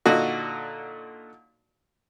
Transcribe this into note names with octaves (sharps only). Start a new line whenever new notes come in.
A#2 D3 D#4 F#4